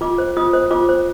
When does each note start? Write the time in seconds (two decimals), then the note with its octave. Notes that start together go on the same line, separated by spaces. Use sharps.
0.01 F4 D6
0.18 C5
0.37 F4 D#6
0.53 C5
0.71 F4 D6
0.89 C5